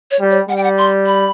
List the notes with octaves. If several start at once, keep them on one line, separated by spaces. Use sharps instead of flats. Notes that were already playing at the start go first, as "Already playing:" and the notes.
C#5
G3
C#5
G3 F#5
G5
F#5
C6
B5